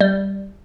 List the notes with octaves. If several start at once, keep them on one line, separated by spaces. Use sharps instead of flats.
G3